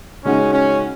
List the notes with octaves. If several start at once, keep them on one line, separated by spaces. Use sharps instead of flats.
C#3 G#3 C#4 D#4 F#4 D#5
C#4